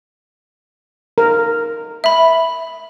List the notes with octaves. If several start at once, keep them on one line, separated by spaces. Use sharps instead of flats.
A#4
E5 B5